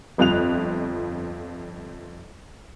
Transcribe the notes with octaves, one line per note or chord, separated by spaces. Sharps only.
G1 F2 F4 F#6 F7